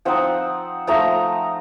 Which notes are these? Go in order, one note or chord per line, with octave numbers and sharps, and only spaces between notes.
F3 C4 D#4 F#5
F3 A3 D#4 A#5